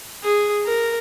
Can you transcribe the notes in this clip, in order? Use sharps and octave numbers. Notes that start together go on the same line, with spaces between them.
G#4
A#4